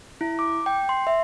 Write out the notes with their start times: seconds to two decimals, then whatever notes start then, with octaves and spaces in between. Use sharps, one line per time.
0.21 E4
0.39 D6
0.66 G5
0.89 C6
1.07 E5